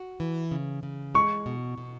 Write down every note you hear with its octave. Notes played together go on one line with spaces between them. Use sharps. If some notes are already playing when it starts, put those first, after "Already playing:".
Already playing: F#4
E3
C#3
C#3
G#3 C#6
B2
B2